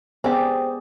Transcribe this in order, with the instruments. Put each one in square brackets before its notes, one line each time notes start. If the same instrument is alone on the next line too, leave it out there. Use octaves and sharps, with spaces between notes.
[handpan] B3 G#4 D5 [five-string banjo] C4 G4